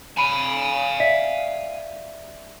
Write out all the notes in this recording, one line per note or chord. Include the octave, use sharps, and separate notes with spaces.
F5 G#5 B5 D#7
D5 E5 B6